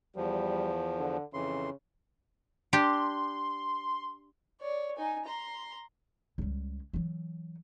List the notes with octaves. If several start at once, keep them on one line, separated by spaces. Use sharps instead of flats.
E2 F3 G3
D3
F2 C#3 E3 C6
D4 G4 C6
C#5 D5
D#4 G#5
A#5 C6
C#2 G3
E3 F#3